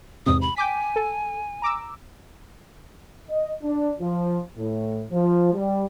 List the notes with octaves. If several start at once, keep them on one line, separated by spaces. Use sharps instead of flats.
E2 G#2 C3 D#6
B5
G5 G#5 D6 B6
A4
A#5 D6 E6
D#5
D4
F3
A2
F3
G3